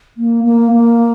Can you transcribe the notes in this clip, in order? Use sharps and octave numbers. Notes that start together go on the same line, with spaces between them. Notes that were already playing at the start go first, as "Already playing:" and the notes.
A#3
A#3
A#3